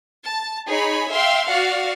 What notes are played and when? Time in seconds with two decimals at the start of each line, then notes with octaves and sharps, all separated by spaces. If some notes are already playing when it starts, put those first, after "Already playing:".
0.25 A5
0.67 D#4 G#4 C#5 B5
1.12 E5 F5 G5 C6
1.47 F#4 D5 F5 F#5